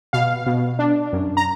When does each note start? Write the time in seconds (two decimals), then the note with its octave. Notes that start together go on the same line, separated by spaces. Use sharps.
0.13 B2 F5
0.46 B2
0.79 D4
1.12 F#2
1.37 A#5